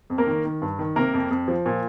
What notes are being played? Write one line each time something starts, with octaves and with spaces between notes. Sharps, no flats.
F2
A#3 A#4
D#3
D#3
G2
D#3
C3 A#3 A#4
F2
F2
F3
A#2